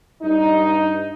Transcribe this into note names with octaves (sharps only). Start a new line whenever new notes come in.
G2 D#4